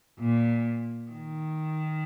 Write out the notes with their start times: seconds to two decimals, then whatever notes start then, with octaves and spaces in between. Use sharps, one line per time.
0.19 A#2
1.11 D#3